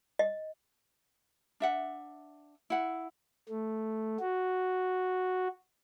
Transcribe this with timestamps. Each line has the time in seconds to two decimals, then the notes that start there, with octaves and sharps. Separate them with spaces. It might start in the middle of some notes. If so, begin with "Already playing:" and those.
0.19 D#5
1.60 D4 E5 F#5
2.70 E4 F#5
3.49 A3
4.20 F#4